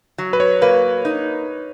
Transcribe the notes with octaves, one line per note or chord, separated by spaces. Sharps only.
F#3
B4
C#5
A#3 B4
D#4